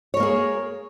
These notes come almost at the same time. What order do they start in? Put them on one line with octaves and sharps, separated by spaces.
C#5 A#4 A#3 G#4